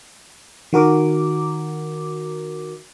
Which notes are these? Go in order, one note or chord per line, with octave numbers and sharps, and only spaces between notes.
D#3 F#4 A#4 D6